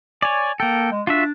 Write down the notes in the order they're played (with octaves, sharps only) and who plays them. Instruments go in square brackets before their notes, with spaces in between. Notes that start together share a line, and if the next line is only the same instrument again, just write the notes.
[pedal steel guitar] C#5 D5 [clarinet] G#5
[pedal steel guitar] A#3 A4 [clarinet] G5
[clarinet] G#3
[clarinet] D4 [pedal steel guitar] F4 F#4 E5